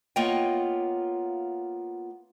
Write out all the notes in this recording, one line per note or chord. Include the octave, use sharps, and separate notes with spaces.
A#3 B3 F4 C#5 D#5 G5